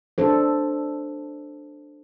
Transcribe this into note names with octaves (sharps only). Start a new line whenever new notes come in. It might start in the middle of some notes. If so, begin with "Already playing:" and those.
D4 A4 C5